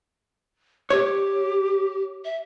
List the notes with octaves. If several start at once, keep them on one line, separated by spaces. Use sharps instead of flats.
G4 C#5
E5